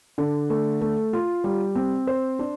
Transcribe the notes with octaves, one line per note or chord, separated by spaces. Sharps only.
D3
A3
A3
F4
G3
C4
C5
D4